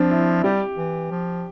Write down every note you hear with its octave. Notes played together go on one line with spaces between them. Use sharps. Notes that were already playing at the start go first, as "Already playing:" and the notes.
Already playing: F3 C4 D4
E4
G3 G4
E3
F3